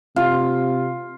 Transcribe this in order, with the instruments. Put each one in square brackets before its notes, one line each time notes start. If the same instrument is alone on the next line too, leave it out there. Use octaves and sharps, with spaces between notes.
[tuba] C3 [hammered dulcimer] F4